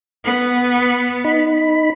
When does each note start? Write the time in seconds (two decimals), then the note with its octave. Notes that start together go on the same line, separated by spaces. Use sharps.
0.24 B3
1.25 D#4 B5